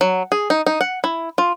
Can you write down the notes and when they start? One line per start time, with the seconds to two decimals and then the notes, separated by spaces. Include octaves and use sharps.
0.01 F#3
0.32 G#4
0.50 D#4
0.67 D#4
0.81 F#5
1.04 E4
1.38 F4